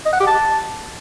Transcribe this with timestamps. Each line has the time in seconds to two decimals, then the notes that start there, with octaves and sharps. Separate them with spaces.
0.06 D#5
0.13 F#5
0.20 G4
0.27 A5